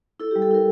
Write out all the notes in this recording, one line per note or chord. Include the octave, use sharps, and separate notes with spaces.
E4 A4
G3 G4
A4
E4 A#4